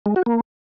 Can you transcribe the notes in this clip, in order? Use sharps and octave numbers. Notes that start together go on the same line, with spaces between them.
G#3
F#4
A#3